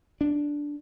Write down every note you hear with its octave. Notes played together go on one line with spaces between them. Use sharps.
D4